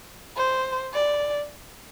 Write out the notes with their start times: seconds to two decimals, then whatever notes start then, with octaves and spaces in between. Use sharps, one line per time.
0.37 C5
0.94 D5